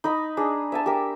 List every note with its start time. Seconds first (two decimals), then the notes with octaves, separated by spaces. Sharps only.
0.04 D#4 D#5 B5
0.37 D4 G#4
0.72 E5 G#5 A5
0.86 G4 A#4